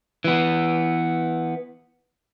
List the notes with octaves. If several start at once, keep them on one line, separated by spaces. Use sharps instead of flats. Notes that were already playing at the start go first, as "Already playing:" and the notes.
E3 B3